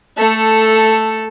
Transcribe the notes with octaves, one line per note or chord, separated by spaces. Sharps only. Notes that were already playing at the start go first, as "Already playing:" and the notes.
A3 A4